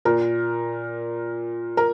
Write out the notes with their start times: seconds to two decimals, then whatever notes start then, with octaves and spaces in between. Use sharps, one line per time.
0.05 A#2 A#4
1.77 A#4